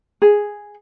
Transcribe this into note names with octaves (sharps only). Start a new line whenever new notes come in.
G#4